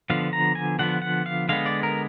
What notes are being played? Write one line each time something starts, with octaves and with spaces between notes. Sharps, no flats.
D3 F3 B3 F5
A#5
G#5
D3 F3 B3 F#5
F#5
F5
D3 G#3 B3 F5
D5
A#4